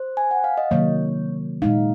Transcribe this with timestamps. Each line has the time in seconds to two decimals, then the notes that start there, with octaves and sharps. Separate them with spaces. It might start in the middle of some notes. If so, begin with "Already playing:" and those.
Already playing: C5
0.17 G#5
0.31 F#5
0.44 F5
0.58 D#5
0.71 C3 D#3 F#3 A#3 C#5
1.62 A#2 G#3 D#4 F5